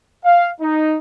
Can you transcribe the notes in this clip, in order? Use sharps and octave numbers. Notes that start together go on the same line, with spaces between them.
F5
D#4